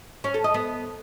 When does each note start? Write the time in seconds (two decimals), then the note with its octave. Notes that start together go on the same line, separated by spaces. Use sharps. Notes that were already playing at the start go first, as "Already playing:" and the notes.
0.24 C#4
0.34 A4
0.44 D#5
0.54 B3